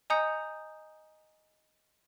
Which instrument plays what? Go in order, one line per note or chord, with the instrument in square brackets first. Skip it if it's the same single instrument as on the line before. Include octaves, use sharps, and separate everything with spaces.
[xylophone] D#5 G#5 A#5 D#6 G6 C#7